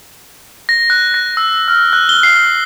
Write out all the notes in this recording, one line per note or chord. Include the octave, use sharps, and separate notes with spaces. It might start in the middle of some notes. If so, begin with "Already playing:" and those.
A#6
F#6
A#6
E6
F6
F#6
G7
C7